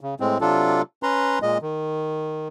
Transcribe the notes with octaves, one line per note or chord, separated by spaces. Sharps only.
C#3
A2 G#3 C4
C3 F#3 D4 F4 A4
C#4 B4 A#5 C6
A#2 G#3 D#5
D#3